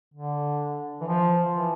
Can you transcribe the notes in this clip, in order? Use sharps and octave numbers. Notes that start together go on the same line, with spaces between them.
D3
E3
F3
E3